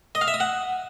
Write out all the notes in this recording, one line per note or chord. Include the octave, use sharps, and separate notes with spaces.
D#5
F5
E5
D#6
F#5